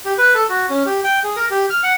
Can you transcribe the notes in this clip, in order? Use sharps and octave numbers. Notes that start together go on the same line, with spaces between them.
G4
B4
A4
F#4
C#4
G4
G5
G#4
A#4
G4
F6
F#5